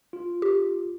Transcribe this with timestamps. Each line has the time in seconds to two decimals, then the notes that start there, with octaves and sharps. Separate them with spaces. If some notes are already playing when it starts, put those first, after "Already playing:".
0.13 F4
0.42 G4